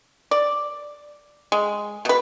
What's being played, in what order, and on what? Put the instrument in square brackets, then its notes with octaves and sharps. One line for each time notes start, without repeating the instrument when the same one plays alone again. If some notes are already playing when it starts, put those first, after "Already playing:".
[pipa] D5
G#3
B2 B4